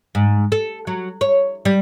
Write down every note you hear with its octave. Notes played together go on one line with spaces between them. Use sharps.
G#2
A4
F#3
C#5
G3